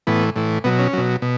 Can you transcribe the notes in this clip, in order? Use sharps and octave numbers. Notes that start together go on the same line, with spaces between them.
A2 E3 B3
A2 E3
B2 F#3 B3
C#4
B2 F#3
B2